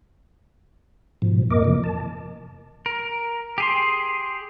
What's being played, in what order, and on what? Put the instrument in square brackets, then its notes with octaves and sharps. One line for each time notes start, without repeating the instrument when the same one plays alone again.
[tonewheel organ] G#2 B2 F3
F2 A#3 A#4 D#5 D6
C3 E3 F3
A5
[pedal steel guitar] A#4
G4 G#4 C6